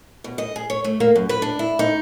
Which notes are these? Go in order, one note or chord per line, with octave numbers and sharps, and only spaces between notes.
B2
D#5
G#4
C#5
A3
A#3
F#2
B4
D4
E4
D#4